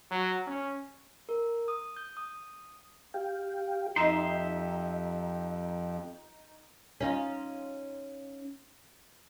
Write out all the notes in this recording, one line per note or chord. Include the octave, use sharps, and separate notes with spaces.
F#3
C#4
A#4
D#6
G6
D#6
G4 F5 G5
F2 D#4 G4 E5 C6
C#4 D#4 F4